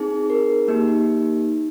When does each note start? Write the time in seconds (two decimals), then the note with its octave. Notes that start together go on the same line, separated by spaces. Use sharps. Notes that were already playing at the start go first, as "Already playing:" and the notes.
Already playing: C4 D#4 G#4
0.30 A#4
0.68 A#3 D#4 G4